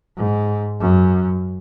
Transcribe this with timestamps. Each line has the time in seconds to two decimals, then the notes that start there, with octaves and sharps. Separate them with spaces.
0.17 G#2
0.81 F#2